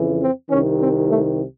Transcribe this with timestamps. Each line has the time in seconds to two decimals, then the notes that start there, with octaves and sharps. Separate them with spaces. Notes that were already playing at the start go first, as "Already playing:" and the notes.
Already playing: F2 C#3 E3
0.21 C4
0.50 C2 C3 D#3 C#4
0.79 C4
1.08 A3